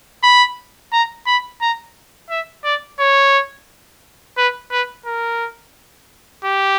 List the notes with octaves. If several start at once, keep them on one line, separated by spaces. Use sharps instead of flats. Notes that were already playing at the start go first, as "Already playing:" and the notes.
B5
A#5
B5
A#5
E5
D5
C#5
B4
B4
A#4
G4